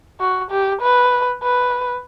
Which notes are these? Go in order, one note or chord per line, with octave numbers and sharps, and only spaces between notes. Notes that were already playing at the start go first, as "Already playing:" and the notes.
F#4
G4
B4
B4